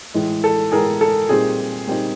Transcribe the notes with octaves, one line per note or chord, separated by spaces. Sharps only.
A2 E3 G#3
A4
A2 E3 G#3 G#4 A#4
A4
A#2 G3 C4 D#4 G#4
A#2 G3 C4 D#4